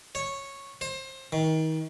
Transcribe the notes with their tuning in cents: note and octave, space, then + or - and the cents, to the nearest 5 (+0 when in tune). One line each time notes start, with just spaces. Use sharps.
C#5 -10
C5 +25
D#3 +30